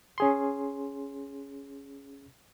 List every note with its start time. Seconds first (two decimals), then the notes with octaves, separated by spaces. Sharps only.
0.18 C#4 G#4 C6